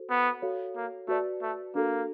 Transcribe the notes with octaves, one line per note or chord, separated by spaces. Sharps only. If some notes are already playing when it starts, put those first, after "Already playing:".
Already playing: F#4 A4 C5
B3
F#4 A4 C#5 F5
A#3
A3 F#4 B4 D5
A3
A#3 D4 F#4 A4